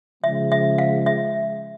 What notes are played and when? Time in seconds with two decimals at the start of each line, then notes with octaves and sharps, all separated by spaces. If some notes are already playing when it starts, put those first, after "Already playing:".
0.23 C#3 F3 G#3 E5
0.52 E5
0.78 F5
1.06 E5